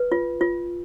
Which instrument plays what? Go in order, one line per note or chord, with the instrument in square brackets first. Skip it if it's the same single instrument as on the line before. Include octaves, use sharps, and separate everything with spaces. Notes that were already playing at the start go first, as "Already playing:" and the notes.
Already playing: [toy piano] B4
F4
F4